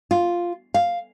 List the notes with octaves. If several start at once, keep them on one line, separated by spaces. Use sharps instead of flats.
F4
F5